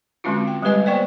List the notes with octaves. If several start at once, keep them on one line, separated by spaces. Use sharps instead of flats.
D3 G#3 C4 C#4 F4 F#4
G5
G3 G#3 G4 B4 D#5 G#5
A#3 B3 C5 D5 G5 C#6